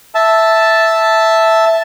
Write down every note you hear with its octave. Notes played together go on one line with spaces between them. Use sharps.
E5 A5